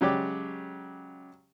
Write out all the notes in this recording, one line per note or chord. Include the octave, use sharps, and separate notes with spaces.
C#3 F#3 G#3 G4 D5